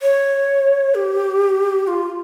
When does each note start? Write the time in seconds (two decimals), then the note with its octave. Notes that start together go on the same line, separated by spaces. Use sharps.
0.02 C#5
0.95 G4
1.87 F4